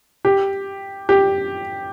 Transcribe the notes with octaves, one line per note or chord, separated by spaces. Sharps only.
G4
G4